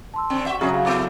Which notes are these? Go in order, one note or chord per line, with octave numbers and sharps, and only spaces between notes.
A5 C6 E6
D3 C4
F#4 E5 F#5 C#6
C#3 F#3 C#4 G#4 E5 A#5
A2 F5
B3 E4 A4 D6